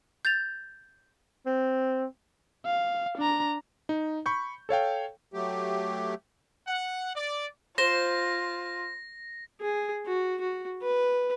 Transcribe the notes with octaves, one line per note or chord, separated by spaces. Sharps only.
G6 A6 F7
C4
F5
D4 A#5
D#4
B5 C#6 G6
A4 C#5 F5 G5
F#3 A3 G4
F#5
D5
F4 C5 A#6
G#4
F#4
F#4
B4